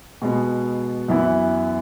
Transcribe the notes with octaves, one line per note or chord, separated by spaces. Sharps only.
B2 G#3 B3
F#2 E3 B3 E4